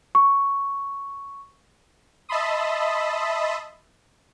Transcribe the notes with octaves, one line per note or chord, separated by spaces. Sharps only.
C#6
D#5 E5 A5 B5 C6 D#6